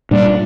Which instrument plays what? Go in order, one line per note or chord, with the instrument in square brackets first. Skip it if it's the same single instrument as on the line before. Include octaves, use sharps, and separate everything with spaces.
[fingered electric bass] A#2 G3 A#3 [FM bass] D4